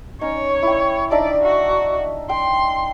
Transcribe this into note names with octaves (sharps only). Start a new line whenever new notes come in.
C#4 D#4 C#5
E4 G5
D4 D#4 D5 E5
F#4
G5 C6